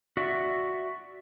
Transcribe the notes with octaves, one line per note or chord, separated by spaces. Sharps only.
F#4 D5 E5